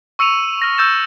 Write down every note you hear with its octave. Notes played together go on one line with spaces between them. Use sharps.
C#6 E6 C#7 D#7 F7
F6 A#6
E6 G6 A6 E7